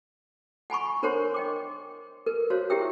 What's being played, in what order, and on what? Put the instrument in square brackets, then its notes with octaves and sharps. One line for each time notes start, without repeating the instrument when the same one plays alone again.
[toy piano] F#5 G#5 B5 C#6
D4 A#4 C5 C#5 F#5 C6
D#5 G5 D6
A#4 B4
F#4 C5 C#5 F5
E4 G4 G#4 E5 G5 E6